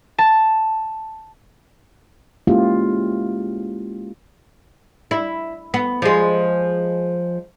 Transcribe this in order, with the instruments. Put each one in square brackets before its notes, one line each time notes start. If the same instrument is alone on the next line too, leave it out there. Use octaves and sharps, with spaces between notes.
[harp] A5
[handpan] G#3 A#3 C#4 E4 F4 G4
[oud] E4
B3
F3 G#3